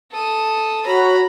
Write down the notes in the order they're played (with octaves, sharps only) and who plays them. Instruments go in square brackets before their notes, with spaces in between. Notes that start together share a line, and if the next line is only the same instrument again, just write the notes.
[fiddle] A4 D#6
[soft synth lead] F#4 [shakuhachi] C#5 [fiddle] A#5 B5